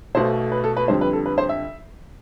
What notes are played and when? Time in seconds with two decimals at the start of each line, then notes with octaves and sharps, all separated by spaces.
0.15 B1 B2 A3 C5
0.52 B4
0.64 A4
0.77 B4
0.88 F2 D3 G3 C5
1.01 B4
1.13 A4
1.26 B4
1.38 C5
1.49 E5